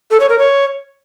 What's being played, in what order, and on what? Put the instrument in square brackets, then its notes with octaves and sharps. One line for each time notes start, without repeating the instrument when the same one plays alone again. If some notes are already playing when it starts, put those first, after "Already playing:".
[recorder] A4
C#5
A#4
C#5